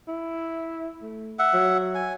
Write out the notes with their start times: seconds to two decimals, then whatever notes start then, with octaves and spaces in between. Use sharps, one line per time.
0.08 E4
1.02 A3
1.39 E5 F#5
1.53 F#3
1.95 G#5